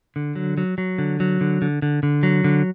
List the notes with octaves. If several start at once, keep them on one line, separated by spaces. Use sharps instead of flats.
D3
F#3
F#3
F#3
D3
F#3
D3
D3
D3
D3
F#3
D3